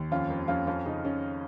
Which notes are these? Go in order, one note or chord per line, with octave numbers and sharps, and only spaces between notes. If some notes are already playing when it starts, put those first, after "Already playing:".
Already playing: D#2
F2 C#4 F4
F2
F2 C#4 F4
F2 C#4 F4
C#3 D#4
C#3 C#4